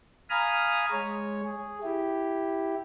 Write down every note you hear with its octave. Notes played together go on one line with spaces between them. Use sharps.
F5 G#5 A#5 B5 D#6 F6
G#3 C#5
G#4
E4 G4